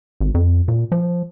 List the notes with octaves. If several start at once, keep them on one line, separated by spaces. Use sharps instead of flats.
G#1
F2
A#2
F3